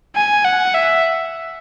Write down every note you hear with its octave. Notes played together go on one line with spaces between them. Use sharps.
G#5
F#5
E5